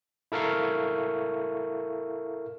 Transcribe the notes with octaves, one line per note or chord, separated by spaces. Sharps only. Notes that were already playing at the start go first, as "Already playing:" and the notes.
E4 A4 A#4 E5 F5 C#6